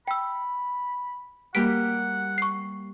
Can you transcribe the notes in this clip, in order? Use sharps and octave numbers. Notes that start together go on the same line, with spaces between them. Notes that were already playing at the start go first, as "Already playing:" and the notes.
G5 B5 E6
G3 A#3 G4 F#5 B6 D7
C#6 C7